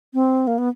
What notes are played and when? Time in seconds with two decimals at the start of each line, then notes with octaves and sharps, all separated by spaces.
0.14 C4
0.47 A#3
0.58 B3